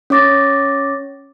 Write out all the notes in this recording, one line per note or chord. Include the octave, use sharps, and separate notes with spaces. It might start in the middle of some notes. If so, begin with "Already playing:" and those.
C#4 C#5 D6 A6 A#6